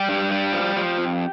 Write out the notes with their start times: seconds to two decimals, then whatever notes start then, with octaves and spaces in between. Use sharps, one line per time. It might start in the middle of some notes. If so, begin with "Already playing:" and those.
Already playing: G3 G4
0.09 G2
0.31 G3
0.53 F3
0.76 F3
0.98 F2